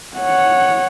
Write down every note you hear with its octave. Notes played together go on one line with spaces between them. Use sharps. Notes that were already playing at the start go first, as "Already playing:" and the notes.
C#5 F#5